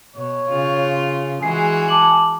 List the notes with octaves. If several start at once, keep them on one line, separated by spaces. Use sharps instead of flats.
B2 C#5
C#3 F4
E3 G#3 F#4 G#4 C7
A5 D6 F#7